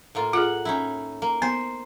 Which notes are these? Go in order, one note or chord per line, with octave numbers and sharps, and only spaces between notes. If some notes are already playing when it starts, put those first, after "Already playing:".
A2 A#3 F4
F4 G#4 F#5
C#4 D#4 E4
A#3
B3 C5